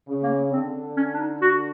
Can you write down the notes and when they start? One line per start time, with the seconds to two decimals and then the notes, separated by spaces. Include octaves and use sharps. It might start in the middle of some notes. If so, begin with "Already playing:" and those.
0.08 C#3
0.23 A#3
0.53 D3 C4
0.96 C#4
1.14 D4
1.19 D#4
1.42 F#4